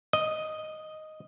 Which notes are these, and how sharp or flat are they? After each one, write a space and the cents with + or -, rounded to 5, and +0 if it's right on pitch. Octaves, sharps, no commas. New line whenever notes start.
D#5 +0